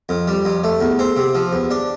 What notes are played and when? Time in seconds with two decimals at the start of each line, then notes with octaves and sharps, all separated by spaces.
0.09 F2
0.28 G3
0.45 F2
0.64 A3
0.81 E2
0.99 C4
1.17 C3
1.35 F3
1.53 E2
1.71 D4